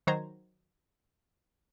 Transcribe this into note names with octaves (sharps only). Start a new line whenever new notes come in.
D#3 F#3 C5 A#5 G#6